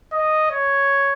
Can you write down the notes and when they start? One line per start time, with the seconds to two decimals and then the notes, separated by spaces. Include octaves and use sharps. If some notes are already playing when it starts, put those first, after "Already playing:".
0.13 D#5
0.51 C#5